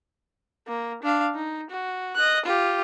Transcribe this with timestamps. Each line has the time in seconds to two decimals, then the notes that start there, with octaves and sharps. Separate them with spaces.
0.67 A#3
1.03 D4 F5
1.35 D#4
1.70 F#4
2.15 D#5 F#6
2.45 F4 G4